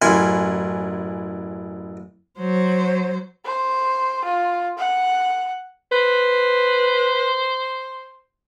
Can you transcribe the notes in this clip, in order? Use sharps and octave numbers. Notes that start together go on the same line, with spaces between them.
A1 F#2 E4 G#5 C6
F#3 C5
C5
F4
F#5
B4 C5